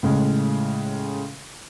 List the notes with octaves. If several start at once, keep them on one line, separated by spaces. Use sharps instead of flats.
A2 C#3 G#3